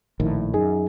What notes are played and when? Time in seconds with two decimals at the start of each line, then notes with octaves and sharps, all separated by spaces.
0.20 A#1 A2 D#3 E4
0.54 F#2 D#4 G#4